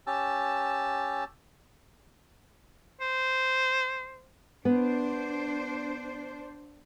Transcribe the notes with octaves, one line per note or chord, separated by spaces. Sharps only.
C#4 G4 A5 E6
C5
B3 D4 C5